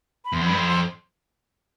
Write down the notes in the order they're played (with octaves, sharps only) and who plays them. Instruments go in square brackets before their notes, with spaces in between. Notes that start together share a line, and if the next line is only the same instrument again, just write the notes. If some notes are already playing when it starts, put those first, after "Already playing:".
[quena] B5
[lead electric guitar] E2 [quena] C6
[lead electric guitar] F2
[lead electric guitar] G2 [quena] B5
[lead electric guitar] F2 [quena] C6
[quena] C6